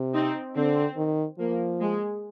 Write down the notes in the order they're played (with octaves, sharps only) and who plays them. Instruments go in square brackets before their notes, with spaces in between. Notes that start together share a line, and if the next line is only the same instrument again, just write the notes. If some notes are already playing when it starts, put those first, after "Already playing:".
Already playing: [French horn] C3
[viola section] C4 D#4
[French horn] D3 [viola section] C4
[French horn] D#3
[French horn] F3 [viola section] A#3
[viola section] G#3